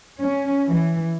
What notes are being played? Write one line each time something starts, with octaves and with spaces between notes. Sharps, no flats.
C#4
E3